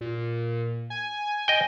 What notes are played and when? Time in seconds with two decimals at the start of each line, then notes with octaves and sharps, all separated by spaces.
0.01 A#2
0.90 G#5
1.48 D#5 G5